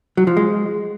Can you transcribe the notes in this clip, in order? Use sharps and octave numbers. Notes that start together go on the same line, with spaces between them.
F#3
F3
G#3